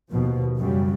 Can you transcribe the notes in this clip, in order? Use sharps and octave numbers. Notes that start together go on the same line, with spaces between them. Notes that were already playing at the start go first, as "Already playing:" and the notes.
D#2 B2 F3
F#2 C#3 F#3 G3